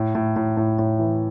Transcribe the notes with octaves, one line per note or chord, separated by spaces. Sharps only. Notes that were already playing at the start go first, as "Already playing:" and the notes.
Already playing: A2
A2
A2
A2
A2
E3